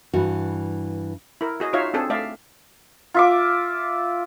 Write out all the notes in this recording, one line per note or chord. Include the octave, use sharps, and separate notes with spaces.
G2 E3 F#4
E4 A#4
F#4 G#4 D#5
D#4 F4 F#4 C#5 E5 F5
C4 D4 G#4 A4
A3 D5 E5 F5
F4 E5 D6